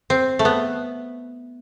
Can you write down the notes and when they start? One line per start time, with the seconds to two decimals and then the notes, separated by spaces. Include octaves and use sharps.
0.10 C4
0.39 A3
0.45 B3